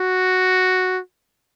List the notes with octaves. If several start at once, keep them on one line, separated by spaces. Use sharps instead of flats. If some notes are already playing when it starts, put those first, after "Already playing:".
Already playing: F#4